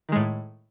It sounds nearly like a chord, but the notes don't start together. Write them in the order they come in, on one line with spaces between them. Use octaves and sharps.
D#3 G#3 A2